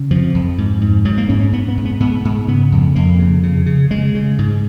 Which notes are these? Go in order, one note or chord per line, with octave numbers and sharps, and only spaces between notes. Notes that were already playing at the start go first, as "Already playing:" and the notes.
Already playing: C#3
F2 F3
F2
G#2
G#2
G#2 F#3
A#3
G#2 C#4
C#4
G#2 B3
B3
G#2
B3
G#2 B3
G#2
C#3 B3
F2
F2 A#3
C#3
C#3
C#3
C#3 G#3
C#3
G#2